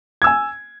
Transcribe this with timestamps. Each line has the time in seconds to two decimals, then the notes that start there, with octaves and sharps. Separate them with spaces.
0.22 G#6
0.24 E6
0.27 G#5